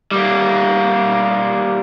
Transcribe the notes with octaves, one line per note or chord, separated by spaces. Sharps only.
G3 A#3